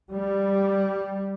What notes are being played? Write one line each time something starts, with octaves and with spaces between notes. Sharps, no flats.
G3